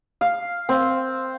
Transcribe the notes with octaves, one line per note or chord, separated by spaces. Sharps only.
F5
C4